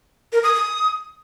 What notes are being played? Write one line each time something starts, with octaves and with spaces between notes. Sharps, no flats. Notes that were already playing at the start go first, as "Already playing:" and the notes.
A#4
D#6
D#6